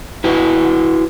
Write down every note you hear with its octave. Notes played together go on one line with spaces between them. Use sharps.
E4 F#4 B4 G5